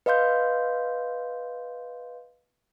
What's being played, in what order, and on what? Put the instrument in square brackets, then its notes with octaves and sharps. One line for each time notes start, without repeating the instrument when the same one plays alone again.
[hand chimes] B4 D#5 F5 C6 G6